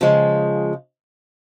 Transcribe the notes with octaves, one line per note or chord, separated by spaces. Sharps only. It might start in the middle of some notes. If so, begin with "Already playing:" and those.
C#3 F3 G#3